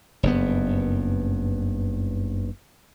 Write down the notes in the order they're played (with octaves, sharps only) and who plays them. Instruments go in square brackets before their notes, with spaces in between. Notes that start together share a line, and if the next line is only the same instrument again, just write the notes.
[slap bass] F#1 G2 B3